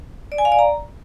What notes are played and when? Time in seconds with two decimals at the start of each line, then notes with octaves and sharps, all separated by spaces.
0.32 D5
0.38 G#5
0.45 F5
0.52 D5
0.59 A#5